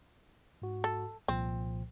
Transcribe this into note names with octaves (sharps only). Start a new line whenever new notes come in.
G#2 F#4
A4
C2 A#2 F3 C4